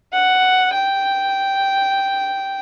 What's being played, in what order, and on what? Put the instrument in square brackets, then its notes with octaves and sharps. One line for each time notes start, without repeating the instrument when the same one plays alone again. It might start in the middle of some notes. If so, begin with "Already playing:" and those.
[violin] F#5
G5